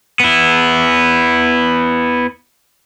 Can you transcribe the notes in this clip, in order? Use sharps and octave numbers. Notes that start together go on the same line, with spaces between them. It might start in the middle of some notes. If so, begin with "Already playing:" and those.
B3 E4